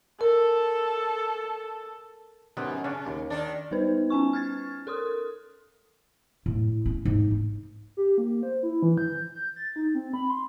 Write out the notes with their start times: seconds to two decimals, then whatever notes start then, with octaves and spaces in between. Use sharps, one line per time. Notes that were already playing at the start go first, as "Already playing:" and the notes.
0.21 A4 A#4
2.57 F#2 C3 D#3 B3
2.84 C#3 C#4 D4
3.07 D#2
3.30 D#3 D4
3.71 G3 B3 D#4 B4 C5
4.10 C#4 G#5 C#6
4.33 F6 G#6 A6
4.87 A4 A#4 C6 D#6
6.46 A2
6.86 C#4
7.05 G#2
7.31 D#4
7.97 G4
8.18 A#3
8.43 C5
8.63 E4
8.83 E3
8.98 G6
9.34 G6
9.56 A6
9.76 D#4
9.95 C4
10.14 B5
10.30 C6